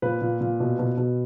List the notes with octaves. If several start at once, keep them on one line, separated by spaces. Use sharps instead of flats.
A#2 B4
A#2
A#2
B2
B2
B2